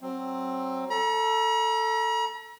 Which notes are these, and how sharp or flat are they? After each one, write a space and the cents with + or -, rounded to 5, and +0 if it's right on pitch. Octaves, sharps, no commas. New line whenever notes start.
F#3 +10 C4 +15
A4 +10 A#5 +45